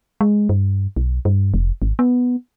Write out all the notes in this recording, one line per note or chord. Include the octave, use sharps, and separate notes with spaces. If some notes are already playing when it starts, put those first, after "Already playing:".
G#3
G2
B1
G2
F1
G#1
B3